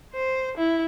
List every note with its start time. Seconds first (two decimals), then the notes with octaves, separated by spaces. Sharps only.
0.14 C5
0.57 E4